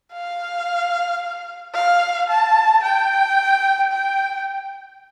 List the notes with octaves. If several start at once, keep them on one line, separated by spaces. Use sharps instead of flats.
F5
F5
A5
G5
G5